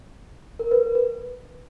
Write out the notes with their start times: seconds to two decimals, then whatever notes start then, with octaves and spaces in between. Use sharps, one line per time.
0.59 A#4
0.71 B4
0.83 A#4
0.95 B4